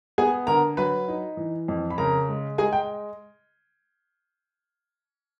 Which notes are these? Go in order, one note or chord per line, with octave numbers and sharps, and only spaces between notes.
B3 G#4 G#5
D3 A#4 A#5
F#3 B4 B5
D#4
E3
F2
B5
C#3 A#4 A#5
G#3
G#3 G#4 G#5
G5